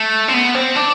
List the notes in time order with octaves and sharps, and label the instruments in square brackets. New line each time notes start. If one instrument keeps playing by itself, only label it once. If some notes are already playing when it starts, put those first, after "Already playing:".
Already playing: [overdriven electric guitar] A3
C4
B3
C4
D4